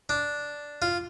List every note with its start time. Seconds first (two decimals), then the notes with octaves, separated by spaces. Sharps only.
0.09 D4
0.82 F4